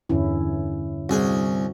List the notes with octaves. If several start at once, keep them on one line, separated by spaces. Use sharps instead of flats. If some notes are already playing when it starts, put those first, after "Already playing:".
E2 G2 D3 C#4 E4
C2 F#4 G#4